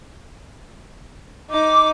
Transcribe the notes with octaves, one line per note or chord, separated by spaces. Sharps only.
D#4 D6